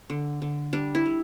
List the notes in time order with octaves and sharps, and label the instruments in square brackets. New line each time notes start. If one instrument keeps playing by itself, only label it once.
[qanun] D3
D3
G3 D4
E4
G3